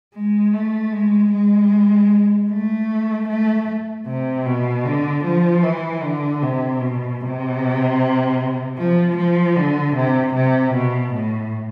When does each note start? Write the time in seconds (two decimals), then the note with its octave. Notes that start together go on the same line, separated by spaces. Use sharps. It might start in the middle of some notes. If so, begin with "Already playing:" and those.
0.14 G#3
0.53 A3
0.92 G#3
1.32 G#3
2.50 A3
3.28 A3
4.07 C3
4.46 B2
4.85 D3
5.24 F3
5.63 E3
6.03 D3
6.42 C3
6.81 B2
7.20 C3
8.78 F3
9.17 F3
9.56 D3
9.95 C3
10.35 C3
10.74 B2
11.13 A2